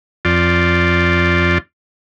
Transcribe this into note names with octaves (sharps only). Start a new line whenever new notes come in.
F2 F4 D5